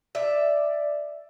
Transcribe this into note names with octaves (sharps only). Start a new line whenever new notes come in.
D5 E5